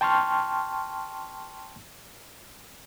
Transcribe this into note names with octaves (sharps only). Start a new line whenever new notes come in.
G5 A5 C6 C#6 F6